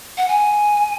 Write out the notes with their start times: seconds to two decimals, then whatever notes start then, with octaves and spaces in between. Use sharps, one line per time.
0.17 F#5
0.28 G#5